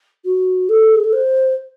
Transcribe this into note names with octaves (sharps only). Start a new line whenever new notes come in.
F#4
A4
G#4
A4
C5